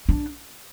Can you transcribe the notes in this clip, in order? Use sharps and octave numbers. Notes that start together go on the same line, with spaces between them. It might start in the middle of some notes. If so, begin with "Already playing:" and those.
D4